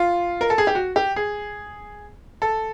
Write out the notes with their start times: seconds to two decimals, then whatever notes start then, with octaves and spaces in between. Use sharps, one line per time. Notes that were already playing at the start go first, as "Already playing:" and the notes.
Already playing: F4
0.41 A#4
0.50 A4
0.58 G#4
0.67 G4
0.75 F#4
0.96 G4
1.16 G#4
2.42 A4